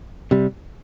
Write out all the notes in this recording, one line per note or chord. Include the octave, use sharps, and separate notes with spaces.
C3 G3